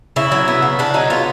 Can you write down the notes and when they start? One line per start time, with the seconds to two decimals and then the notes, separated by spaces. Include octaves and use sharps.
0.16 C#3 E4
0.32 F#3
0.48 B3
0.62 C#3
0.79 C#3 D4
0.94 F#3 D#4
1.10 B3 F4